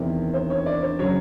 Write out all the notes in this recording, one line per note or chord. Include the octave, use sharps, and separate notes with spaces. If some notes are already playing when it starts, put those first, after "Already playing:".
Already playing: E2 C3 D#3 C5
C5
C#5
D5
C5
C#3 F#3 C#5